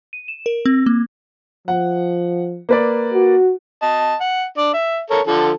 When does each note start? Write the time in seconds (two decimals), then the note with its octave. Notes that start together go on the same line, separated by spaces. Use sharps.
0.13 D#7
0.28 E7
0.46 A#4
0.65 C4
0.86 A#3
1.68 F3 F#5
2.69 A#3 B4 D5
3.13 F#4
3.82 D#5 A5
4.20 F#5
4.58 D4 D5
4.73 E5
5.10 A4 A#4 C#5
5.27 D3 F3 A4